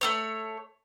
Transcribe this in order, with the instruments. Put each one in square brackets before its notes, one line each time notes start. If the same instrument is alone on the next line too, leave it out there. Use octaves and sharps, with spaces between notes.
[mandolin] A3 C4 C#5